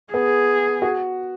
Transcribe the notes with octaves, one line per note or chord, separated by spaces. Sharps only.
B3 G#4
F#4